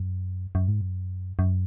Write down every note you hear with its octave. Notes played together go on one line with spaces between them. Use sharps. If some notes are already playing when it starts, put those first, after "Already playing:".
Already playing: F#2
F#2
G#2
F#2
F#2